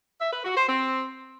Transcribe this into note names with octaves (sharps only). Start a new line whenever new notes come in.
E5
B4
F#4
C5
C4